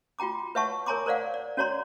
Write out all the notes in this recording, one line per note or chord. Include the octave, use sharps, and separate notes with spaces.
F4 F#4 G5 A#5 D6
B4 C#5 E5 F#5 A5 C#6
A#4 C#5 G#5 A#5 C6 D6
A#4 C5 D5 F5 F#5
D5
C#4 F#4 C#5 D5 A#5 C6